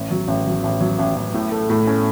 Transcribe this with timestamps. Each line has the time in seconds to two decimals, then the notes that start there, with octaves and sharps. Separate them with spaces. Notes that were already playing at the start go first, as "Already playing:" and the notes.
Already playing: A1
0.11 F#3
0.28 A1
0.46 F#3
0.63 A1
0.81 F#3
0.99 A1
1.16 A1
1.34 A2
1.52 A3
1.70 A2
1.87 C#4